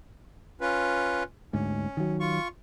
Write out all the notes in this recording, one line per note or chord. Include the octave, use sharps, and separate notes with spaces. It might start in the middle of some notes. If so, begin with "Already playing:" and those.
C#4 F4 B4
D2 G#2 C#4
D#3 F#3
F4 C#6